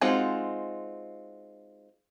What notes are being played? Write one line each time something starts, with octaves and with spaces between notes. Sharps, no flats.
G#3 C4 D#4 F4 F#4